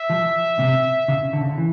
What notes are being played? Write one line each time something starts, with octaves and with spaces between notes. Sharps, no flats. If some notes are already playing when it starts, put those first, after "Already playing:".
Already playing: E5
F3
C3
C#3
D3
C#3
D3
E3